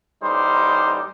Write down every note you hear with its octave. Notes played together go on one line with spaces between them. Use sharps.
A1 G3 D#4 C5